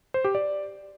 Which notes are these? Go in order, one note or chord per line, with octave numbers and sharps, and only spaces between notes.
C5
G4
D5